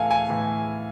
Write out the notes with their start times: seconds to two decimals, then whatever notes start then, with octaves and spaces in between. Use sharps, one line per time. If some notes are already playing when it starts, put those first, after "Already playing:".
Already playing: A2 E3 A4 F5 G#5
0.11 G#5
0.29 A2 E3